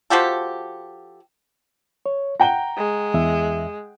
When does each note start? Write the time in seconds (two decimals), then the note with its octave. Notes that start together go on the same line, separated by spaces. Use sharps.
0.10 F3 F#4 G4 A4
2.06 C#5
2.40 F#5 G5 A#5 G7
2.77 G#3
3.14 E2 E5